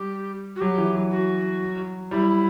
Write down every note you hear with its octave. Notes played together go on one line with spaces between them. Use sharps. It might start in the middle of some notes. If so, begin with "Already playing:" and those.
Already playing: G3 G4
F#4
F#3 G4
E3
F#3
F#4
G3 E4